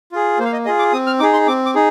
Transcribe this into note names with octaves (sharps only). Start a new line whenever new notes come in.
F4 G#4
A#3 C5
F5
D#5
F4 G#4 D#5
D6
C4 D#6
F6
D#4 G#4 D6
C6
C4 D6
D6
D#4 G#4